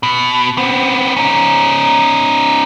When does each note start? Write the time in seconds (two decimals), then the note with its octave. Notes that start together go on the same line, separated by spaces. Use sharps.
0.03 B2
0.58 B3 C4
1.17 C#4 D#4